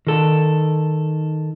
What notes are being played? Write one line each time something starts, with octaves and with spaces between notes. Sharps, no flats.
D#3 A4